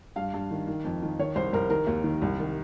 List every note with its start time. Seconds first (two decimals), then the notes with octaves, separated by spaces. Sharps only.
0.16 G2 F5
0.34 G2
0.51 D#3
0.67 D#3
0.84 F2
1.02 D#3
1.19 D#3 C#5
1.35 C2 C5
1.53 C2 A#4
1.70 D#3 A#4
1.87 D#2
2.04 D#3
2.22 C2
2.39 D#3